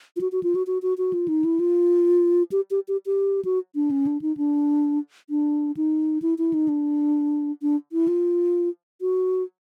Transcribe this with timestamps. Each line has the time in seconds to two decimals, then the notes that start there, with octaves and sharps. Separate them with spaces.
0.16 F4
0.21 F#4
0.32 F#4
0.43 F4
0.55 F#4
0.67 F#4
0.82 F#4
0.98 F#4
1.13 F4
1.28 D#4
1.44 E4
1.60 F4
2.52 G4
2.71 G4
2.88 G4
3.06 G4
3.45 F#4
3.75 D4
3.91 C#4
4.07 D4
4.22 D#4
4.37 D4
5.30 D4
5.77 D#4
6.22 E4
6.38 E4
6.53 D#4
6.68 D4
7.62 D4
7.92 E4
8.08 F4
9.01 F#4